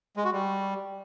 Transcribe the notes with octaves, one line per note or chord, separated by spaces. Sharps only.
G#3
F#4
G3